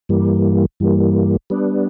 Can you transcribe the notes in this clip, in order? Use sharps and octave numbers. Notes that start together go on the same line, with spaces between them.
G2 E3 G3 A#3
G2 E3 G3 A#3
G3 B3 D4